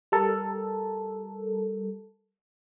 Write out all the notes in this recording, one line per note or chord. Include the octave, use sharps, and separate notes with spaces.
G3 A4 A#4